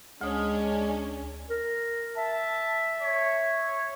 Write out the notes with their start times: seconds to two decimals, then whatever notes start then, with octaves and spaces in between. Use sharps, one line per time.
0.21 D2 G#3 C#4 D4 D#6
1.50 A#4
2.17 E5 A5
3.02 C#5